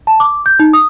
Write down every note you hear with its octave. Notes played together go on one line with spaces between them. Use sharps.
A5
D6
G6
D#4
D#6